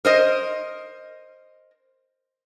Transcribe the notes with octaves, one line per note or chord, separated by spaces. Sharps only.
A#4 C5 D#5